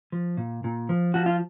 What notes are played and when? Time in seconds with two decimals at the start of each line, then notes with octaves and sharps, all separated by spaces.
0.12 F3
0.37 A#2
0.64 A#2
0.89 F3
1.14 F3 F#4
1.26 F4